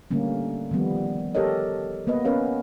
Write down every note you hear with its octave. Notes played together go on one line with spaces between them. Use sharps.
D3 G3 A3 A#3 C#4
D#3 F3 G3 B3
G4 A4 A#4 C#5 D#5
A#3 B3 B4 D#5
B3 C#4 A#4 B4 C#5 F5